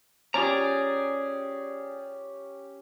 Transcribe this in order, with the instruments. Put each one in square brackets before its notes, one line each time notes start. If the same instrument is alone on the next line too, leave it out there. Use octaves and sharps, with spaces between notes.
[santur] C#4 G4 [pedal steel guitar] G#4 D5 A#5